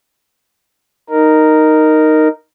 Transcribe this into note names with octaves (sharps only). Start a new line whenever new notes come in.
D#4 A#4